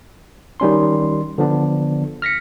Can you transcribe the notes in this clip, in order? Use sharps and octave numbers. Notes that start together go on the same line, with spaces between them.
D#3 G3 C#4 C6
D3 F3 B3 D4
F6 A#6 B6 C#7